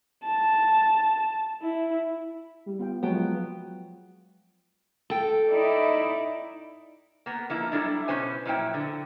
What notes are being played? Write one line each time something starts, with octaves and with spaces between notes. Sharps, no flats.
A5
E4
G3
B3 F4 G5
F3 F#3 G#3 B3 F4 F#4 G#4 G5
A4 G5
D#4 E4 D5
A#3 B3
F3 A#3 E4
F#3 G3 A3 D4 E4
B2 C#4 B4 C5 G#5
A#2 F3 F#3 E4 G5
D3